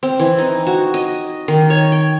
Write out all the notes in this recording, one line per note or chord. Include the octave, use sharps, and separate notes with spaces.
C4
E3
D#4
F#4
D#5
D#3
C#5
G5